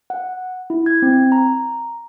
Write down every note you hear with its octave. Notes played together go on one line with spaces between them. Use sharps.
F#5
E4
G#6
C4
A#5